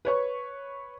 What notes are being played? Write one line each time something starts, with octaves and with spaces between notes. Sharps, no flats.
B4 C#5 C#6